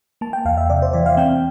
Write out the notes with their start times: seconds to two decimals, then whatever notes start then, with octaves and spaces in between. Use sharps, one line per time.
0.21 A#3 A5
0.33 G5
0.45 E2 F5
0.57 E5
0.70 C3 D5
0.82 C5
0.93 E3 D5
1.06 F5
1.17 C4 G5